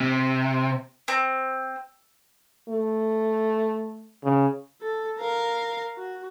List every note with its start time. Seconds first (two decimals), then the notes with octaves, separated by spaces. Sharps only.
0.01 C3
1.08 C4
2.69 A3
4.24 C#3
4.81 A4
5.19 A#4 F5
5.97 F#4